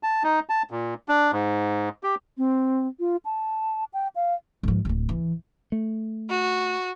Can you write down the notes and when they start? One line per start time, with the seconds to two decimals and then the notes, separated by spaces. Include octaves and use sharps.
0.03 A5
0.24 D#4
0.49 A5
0.71 A#2
1.08 D4
1.32 G#2
2.03 G4
2.37 C4
3.00 F4
3.25 A5
3.93 G5
4.15 F5
4.63 G#2 F3
4.85 D1 G#1
5.09 E3
5.72 A3
6.30 F#4